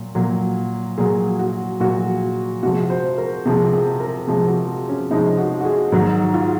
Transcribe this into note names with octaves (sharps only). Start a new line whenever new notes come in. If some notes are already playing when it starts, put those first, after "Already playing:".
Already playing: A#2 F#3
A#2 F#3
A#2 F#3 G#4
F#4
A#2 F#3 F#4
C3 F3 G#3 F#4
C5
A#4
C3 F3 G#3 G#4
G#4
A#4
C3 F3 G#3 G#4
F#4
C#4
C3 F3 G#3 D#4
F#4
F#4
G#4
G#2 D#3 F#3 F#4
F4